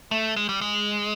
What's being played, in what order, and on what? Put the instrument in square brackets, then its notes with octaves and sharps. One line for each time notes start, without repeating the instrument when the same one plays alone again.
[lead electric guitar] A3
G#3
G3
G#3